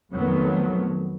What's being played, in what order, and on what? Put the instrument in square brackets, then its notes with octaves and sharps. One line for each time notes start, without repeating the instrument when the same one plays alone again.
[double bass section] F2 D#3 F3 F#3 A3 B3